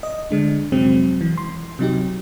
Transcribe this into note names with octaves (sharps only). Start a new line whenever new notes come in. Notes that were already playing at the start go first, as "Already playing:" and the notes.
D#5
D3 G#3 D4
F2 C3 F#3 G#3 C4
E3
C6
C3 F#3 D#4 G4